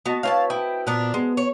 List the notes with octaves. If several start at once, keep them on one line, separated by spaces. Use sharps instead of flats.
B3 F#4 D#5 A5
C4 E4 B4 C#5 F5 G#5 A5
E4 G5 D#6
A#2 B3 D4 A#4
G#3 B3
C#5